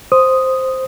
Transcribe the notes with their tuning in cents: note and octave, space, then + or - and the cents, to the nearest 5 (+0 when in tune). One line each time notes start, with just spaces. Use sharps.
C5 +0 D#6 +0